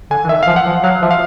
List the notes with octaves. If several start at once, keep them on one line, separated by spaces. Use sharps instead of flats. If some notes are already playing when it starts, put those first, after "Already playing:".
D3 G#5
E3
D#3 E5
F3 F5
F#5
F3
F#3 F5
F3 E5
F5